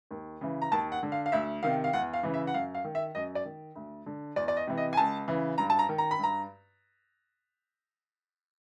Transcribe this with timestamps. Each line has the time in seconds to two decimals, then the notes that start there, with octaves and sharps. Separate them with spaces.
0.11 D#2
0.41 C#3 E3
0.62 A#5
0.71 D#2 A5
0.92 F#5
1.03 D3
1.12 F5
1.26 F5
1.32 D2 E5
1.63 C3 D#3 F5
1.84 F5
1.93 E2 F#5
2.14 F5
2.23 C#3 E3
2.34 E5
2.47 F#5
2.54 F#2 F5
2.75 F5
2.84 D#3
2.95 E5
3.15 F#2 D#5
3.35 D5
3.45 D#3
3.75 D2
4.06 D3
4.36 E2 D5
4.48 D5
4.57 D#5
4.67 C3 E3
4.77 D#5
4.93 G#5
4.97 C#2 A5
5.28 C#3 E3
5.58 G2 A#5
5.70 A5
5.79 A#5
5.89 D#3
5.98 A#5
6.11 B5
6.18 G2
6.23 A#5